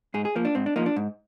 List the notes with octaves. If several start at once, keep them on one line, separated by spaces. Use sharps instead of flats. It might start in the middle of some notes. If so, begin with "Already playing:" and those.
G#2 G#4
G#4
F3 A#3
D4
G#2 C4
D4
F3 A#3 D#4
D4
G#2